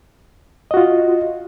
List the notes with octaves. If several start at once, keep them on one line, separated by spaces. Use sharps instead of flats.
F4 F#4 D#5